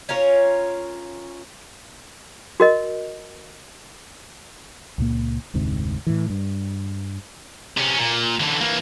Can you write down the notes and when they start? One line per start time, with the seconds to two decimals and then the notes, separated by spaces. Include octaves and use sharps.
0.09 C#4 F4 A#4 C#5
2.60 F#4 A#4 D#5
4.98 C#2 A#2 A#3
5.54 F1 D2 G#2 C3
6.07 A2 E3
6.30 G2
7.77 C3 C#4
7.98 A#2
8.40 D3 E3
8.61 E3 A#3